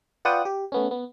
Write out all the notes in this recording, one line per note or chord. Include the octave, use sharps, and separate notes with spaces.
F4 B4 D5 F#5 G5 D#6
G4
A3 B3 C#4
B3